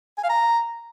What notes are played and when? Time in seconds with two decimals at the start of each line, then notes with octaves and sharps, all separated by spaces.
0.18 G#5
0.24 F5
0.29 A#5